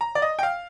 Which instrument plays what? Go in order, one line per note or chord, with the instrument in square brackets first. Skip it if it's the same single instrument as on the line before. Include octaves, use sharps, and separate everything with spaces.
[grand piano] A#5
D5
D#5
G5
F5